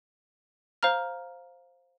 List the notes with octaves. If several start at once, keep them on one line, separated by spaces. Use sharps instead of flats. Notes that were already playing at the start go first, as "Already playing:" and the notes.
C5 F5 A#5 F6